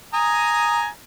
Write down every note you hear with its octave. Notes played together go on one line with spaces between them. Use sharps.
G#5 A#5 D#6